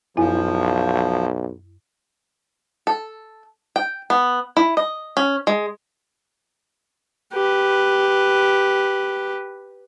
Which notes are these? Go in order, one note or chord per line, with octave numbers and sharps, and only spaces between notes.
B1 F#2 F3 E4 G#5
A4
G5
B3
E4
D#5
C#4
G#3
G4 B4